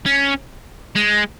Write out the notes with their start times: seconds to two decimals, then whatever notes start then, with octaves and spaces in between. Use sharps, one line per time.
0.06 C#4
0.95 G#3